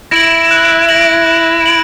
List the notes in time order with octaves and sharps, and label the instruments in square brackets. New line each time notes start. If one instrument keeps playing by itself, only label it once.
[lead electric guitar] E4 [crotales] A#6 D7 F#7
[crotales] F#6
A#6 D7 F#7
F#6
D7 F#7